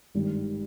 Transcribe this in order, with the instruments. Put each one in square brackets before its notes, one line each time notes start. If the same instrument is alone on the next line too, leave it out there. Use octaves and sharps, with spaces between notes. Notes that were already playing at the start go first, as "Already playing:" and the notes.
[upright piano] G#1 G2 D#3 G3